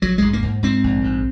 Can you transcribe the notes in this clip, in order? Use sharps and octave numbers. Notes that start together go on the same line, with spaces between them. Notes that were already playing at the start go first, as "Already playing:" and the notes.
A#1 F#3
G#2 G#3
A#3
G#2
G#2 C4
A#1
G#2